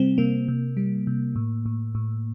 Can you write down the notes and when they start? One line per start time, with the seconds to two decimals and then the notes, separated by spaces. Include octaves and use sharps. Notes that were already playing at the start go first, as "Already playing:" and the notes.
Already playing: C3 G3 C4
0.18 C3 A#3
0.48 C3
0.77 G3
1.07 C3
1.36 A2
1.66 A2
1.95 A2